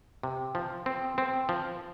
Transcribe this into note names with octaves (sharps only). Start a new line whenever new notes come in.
C3
F3
C4
C4
F3